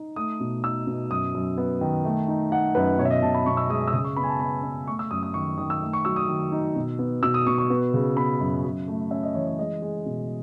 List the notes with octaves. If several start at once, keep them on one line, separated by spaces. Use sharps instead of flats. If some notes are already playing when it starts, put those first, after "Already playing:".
Already playing: D#4
A3 D#6
B2
D#4 E6
B2
F#2 D#6
F#2
B3
D#3
A3
D#4
D#4 F#5
F#2 B4
B2 C#5
E5
D#5
B2 A5
B5
B2 C#6
E6
G#3 D#6
E6
C#3 D#6
C#6
B3 B5
G#5
A5
B3 B5
B3
A3 C#6
E6
F#2 D#6
D#6
D#3 C#6
D#3 D#6
E6
A3
C#6
F#3 E6
D#6
D#3
D#4
B2
B3
B2 E6
D#6
B2 C#6
C#6
B3
C#3
B3 B5
F#2
F#2
A3
C#4 E5
D#5
E3 C#5
C#5
G#3 D#5
G#3
B2